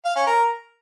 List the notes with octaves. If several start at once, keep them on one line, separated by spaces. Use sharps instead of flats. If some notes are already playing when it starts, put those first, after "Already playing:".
F5
C#4
A#4